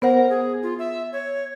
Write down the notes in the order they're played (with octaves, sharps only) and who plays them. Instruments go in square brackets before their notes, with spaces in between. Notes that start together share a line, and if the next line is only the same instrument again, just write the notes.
[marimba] B3 C5 F#5 [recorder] A#4
[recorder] G#4
F4
E5
C#5